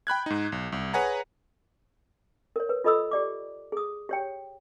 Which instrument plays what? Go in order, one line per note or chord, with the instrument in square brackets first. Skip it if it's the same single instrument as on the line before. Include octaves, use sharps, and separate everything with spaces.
[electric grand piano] G5 B5 F#6 G#6
G#2 D#4
B1
C2
G#4 B4 C#5 F#5 G#5 A#5
[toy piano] A#4 C#5
B4
F4 A4 D#5 B5 D#6 E6
G4 D5 D6
G#4 D#6
G4 C#5 G5